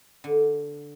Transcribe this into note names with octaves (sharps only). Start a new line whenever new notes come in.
D3